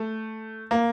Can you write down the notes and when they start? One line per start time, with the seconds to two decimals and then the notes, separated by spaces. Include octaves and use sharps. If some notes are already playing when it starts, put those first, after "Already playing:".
Already playing: A3
0.71 A#3